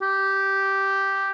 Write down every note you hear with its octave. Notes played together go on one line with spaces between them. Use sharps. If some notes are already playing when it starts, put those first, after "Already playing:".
G4